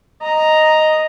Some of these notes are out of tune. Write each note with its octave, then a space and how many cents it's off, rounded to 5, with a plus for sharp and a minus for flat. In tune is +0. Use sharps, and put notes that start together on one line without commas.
D#5 +0 A#5 +0